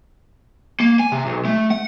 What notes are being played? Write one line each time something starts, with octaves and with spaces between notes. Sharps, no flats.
A#3
G#5
C3
B1
A3
F#5